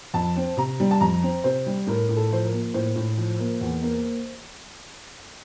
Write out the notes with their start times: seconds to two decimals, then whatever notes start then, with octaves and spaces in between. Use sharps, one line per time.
0.14 F2 A5
0.36 C4
0.57 C3 A#5
0.80 G3
0.91 A5
1.01 F2 A#5
1.23 C4
1.44 C3 C5
1.66 G3
1.87 A2 A#4
2.09 A2
2.17 A4
2.32 F3 C5
2.45 A#4
2.52 A#3
2.74 A2 C5
2.96 A2
3.17 F3
3.39 A#3
3.61 E2
3.82 A#3